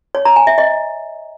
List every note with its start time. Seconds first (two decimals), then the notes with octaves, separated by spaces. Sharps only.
0.15 C#5
0.25 A#5
0.36 G#5
0.47 E5
0.58 D#5